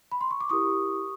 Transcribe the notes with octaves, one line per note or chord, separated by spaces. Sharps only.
B5
C6
C#6
D6
E4 G4 A#4 C#6 D#6